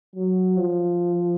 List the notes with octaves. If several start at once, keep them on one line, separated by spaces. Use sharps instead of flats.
F#3
F3